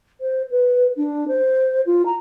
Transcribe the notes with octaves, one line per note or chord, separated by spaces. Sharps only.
C5
B4
D4
C5
F4
A#5